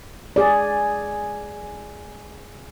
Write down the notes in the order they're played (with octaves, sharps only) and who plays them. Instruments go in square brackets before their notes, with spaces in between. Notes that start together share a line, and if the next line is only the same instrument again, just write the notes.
[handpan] G#4 D5